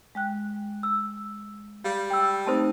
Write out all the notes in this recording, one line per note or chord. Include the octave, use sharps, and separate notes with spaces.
G#3 G5 F#6
E6
G3 F5
G5 E6
A3 C4 D#4 C5 E5 A5